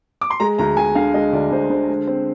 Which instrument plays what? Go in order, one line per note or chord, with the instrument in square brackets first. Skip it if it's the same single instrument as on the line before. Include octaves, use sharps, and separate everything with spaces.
[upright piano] D6
C6
G#3 A#5
D2 A#5
D2 G#5
D3 F5
G#3 D#5
D2 D5
D2 C5
D3 C5
G#3
C4